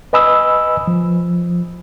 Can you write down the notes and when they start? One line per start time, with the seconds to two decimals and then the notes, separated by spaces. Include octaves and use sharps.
0.13 B4 D#5 G#5 B5 D#6 E6
0.87 F3